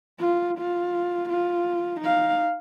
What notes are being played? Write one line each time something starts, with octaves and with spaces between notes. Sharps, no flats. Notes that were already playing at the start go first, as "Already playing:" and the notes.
F4
F4
F4
D#4 F5